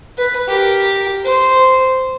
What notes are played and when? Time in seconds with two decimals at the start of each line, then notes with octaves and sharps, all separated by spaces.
0.18 B4
0.48 G4 A#4
1.24 C5